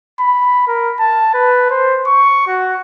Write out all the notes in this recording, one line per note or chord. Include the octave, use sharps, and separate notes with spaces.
B5
A#4
A5
B4
C5
C#6
F#4